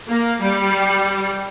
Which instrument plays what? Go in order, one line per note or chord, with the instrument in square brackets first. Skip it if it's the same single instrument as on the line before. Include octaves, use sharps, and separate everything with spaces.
[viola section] A#3
G3